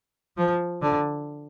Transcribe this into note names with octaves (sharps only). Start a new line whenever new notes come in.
F3
D3